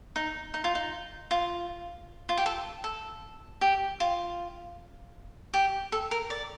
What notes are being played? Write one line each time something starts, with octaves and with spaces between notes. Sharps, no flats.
D#4
D#4
F4
D#4
F4
F4
G4
A4
A4
G4
F4
G4
A4
A#4
D5